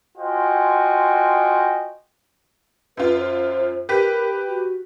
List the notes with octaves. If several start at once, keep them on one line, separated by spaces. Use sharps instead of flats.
F4 F#4 C5 D#5 G5 G#5
F#2 F4 B4
C5
G4 A#4 B4 B6
F#4